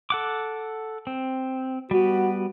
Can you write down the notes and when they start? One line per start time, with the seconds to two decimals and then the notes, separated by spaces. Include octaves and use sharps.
0.10 A4 F#5 D6
1.07 C4
1.91 G3 B3 F#4